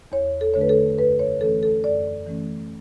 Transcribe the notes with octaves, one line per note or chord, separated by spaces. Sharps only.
E2 C#5
A4
D3 A3 D4 C#5
B4
A4
F#2 B4
C#5
E3 A3 C#4 A4
A4
F#2 D5
E3 A3 C#4